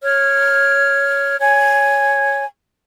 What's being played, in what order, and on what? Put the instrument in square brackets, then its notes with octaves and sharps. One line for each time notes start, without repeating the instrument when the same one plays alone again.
[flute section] C#5 F6
C#5 G#5